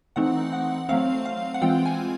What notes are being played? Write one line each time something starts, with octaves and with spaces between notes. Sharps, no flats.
E3 A3 C4 D#4 F#5
F#5
F#3 A3 C4 F5
F5
F#5
E3 G#3 C4 F4 G5
G#5